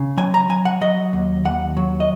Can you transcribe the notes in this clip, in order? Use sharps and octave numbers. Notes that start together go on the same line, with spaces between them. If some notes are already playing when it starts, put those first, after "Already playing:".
Already playing: C#3
F#3 G#5
A#5
F#3 G#5
F#5
F#3 D#5
D#2
D#2 F#5
F#3
D#5